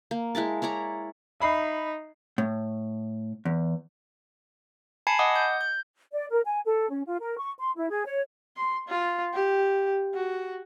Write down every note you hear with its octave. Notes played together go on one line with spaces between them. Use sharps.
A#3
G#3 E4 A#4 A5
E4 C#5 D5 A#5
D#4 E5 B5 C7
A2
E2
G#5 A5 B5 G#6 C7 C#7
D#5 F#5 D6 D#6
G6
G6
D5
A#4
G#5
A4
C#4
F4
A#4
C#6
C6
E4
G#4
C#5
C6
F4
G4
F#4